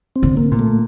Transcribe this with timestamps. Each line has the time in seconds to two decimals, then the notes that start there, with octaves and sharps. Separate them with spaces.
0.16 C4
0.23 D3
0.37 A#3
0.51 A#2
0.59 A3